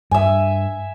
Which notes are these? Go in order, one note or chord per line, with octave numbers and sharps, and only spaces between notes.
G2 E5 G#5